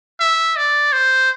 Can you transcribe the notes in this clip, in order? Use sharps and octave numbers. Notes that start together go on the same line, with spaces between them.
E5
D5
C5